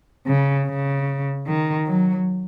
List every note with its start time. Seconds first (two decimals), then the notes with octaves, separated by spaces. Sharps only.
0.27 C#3
0.67 C#3
1.47 D#3
1.87 F#3